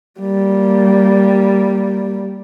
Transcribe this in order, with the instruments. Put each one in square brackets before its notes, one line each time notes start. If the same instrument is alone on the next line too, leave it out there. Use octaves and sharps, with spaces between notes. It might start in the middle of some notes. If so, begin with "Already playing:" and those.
[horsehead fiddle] G3 A#3